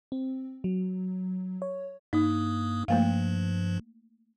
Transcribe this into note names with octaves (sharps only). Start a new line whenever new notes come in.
C4
F#3
C#5
G2 A#3 D#4 D#6
G2 F3 A3 A#3 F5